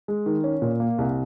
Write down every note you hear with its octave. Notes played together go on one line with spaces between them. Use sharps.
G#3
D#3
C#4
A#2
A#3
C2